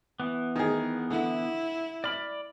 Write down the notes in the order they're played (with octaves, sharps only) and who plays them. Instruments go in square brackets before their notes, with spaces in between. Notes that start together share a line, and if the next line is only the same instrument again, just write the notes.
[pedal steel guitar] E3 B3
[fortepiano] D#3 G#4
[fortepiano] D3 [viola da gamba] E4
[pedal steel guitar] D5 B5 [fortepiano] F6